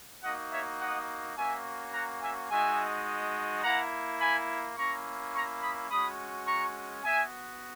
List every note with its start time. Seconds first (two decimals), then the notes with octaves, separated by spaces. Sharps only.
0.23 A#3 D#4 F#4 D#5 F#5
0.52 C#5 E5
0.80 D#5 F#5
1.36 A#3 C#4 F#4 E5 G#5
1.94 F#5 A#5
2.22 E5 G#5
2.50 G#3 D#4 F#4 E5 G#5
3.63 A#3 E4 F#5 A#5
4.20 G#5 B5
4.76 A#3 C#4 E4 A#5 C#6
5.34 A#5 C#6
5.61 B5 D#6
5.90 G#3 C#4 F#4 B5 D#6
6.46 A#5 C#6
7.04 B3 F#4 E5 G#5